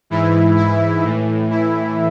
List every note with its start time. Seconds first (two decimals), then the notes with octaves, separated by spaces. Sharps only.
0.10 G#2 E3 E4
0.57 E4
1.04 A2 E3
1.51 E4